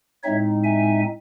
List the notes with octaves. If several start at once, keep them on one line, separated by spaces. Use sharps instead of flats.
A2 G#3 C4 D#4 C#5 E5
E5 G#5